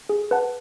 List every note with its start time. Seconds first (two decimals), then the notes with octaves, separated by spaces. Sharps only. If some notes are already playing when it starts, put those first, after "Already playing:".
0.09 G#4
0.31 B4 F#5 A5